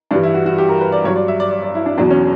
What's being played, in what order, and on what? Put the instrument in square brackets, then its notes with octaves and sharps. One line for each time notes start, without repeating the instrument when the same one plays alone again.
[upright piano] G2 E3 G3 D4
E4
F#4
F#4
G4
A#4
B4
D5
G2 C#5
F#3
D5
E5
D5
D5
D5
E4
D4
E2 B2 F#3 D4
C#4